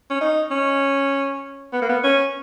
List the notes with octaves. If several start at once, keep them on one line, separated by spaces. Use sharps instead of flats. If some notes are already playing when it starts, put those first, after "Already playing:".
C#4
D#4
C#4
B3
A#3
B3
C#4